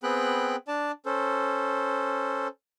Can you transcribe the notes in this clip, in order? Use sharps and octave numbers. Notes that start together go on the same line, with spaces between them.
B3 C4 G#4 G5 B5 F#6
D4 D5 A5
C#4 A4 C5